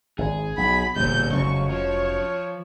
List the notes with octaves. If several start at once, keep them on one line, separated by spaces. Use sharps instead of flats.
G#1 G#4
B1 B5
E1 A#2 D3 G3 G6
F1 C#2 F#3 C#4 C#6
F3 C#5